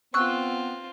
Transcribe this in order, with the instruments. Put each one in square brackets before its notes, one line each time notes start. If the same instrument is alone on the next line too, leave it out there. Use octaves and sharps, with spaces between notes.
[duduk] B3 [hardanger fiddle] C4 F4 [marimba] C#6 [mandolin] E6 F#6